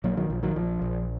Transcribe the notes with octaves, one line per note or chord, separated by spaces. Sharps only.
A#1 F#3 A#3
D#3 F#3
A#1 F3
D#3 F#3
A#1 F3
A#1